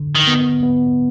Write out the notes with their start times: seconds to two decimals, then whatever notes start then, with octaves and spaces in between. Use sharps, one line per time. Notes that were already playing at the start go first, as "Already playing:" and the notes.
Already playing: D3
0.15 D#3
0.28 B3
0.63 B3